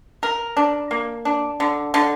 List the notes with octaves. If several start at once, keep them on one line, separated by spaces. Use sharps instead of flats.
A#4
D4
A#3
D4
D3
D3